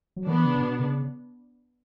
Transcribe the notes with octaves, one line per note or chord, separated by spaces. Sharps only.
F#3
E3 B3 D4
C#3
C#3
B2
C#3